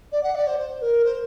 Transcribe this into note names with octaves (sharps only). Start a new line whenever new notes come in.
D5
F#5
D5
C5
C5
A#4
C5